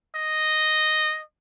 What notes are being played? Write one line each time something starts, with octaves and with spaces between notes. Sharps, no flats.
D#5